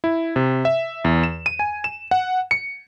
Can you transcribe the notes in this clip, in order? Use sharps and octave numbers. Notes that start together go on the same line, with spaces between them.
E4
C3
E5
E2
E7
D#7
G#5
E7
F#5
C#7